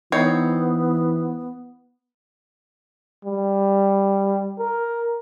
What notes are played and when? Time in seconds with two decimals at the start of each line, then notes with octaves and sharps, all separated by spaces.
0.12 E3 B3 C4 D#4 C#5
3.25 G3
4.59 A#4